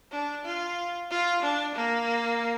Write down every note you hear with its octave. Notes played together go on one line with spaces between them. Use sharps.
D4
F4
F4
D4
A#3